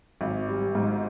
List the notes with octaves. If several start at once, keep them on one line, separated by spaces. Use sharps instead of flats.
G#1
G3
G#2